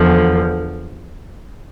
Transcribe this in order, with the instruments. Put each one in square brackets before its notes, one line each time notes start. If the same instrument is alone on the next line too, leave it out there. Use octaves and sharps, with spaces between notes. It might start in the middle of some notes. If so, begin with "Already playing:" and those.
Already playing: [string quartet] E2 D3 F3